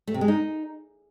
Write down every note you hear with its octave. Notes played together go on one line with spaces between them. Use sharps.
A3
C3
G#3
D#4